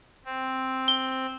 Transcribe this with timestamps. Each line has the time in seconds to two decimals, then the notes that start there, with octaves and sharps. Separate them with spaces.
0.25 C4
0.88 G7